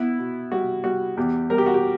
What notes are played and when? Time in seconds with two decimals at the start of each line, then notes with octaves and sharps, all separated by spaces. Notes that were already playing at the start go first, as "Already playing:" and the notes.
Already playing: B3 E4
0.18 B2
0.52 G3 F#4
0.83 G3 F#4
1.17 E2 G4
1.50 G3 A#4
1.58 G4
1.66 F#4
1.74 G4